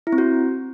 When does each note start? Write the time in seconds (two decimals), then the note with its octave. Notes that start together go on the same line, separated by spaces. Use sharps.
0.07 E4
0.13 C4
0.18 F#4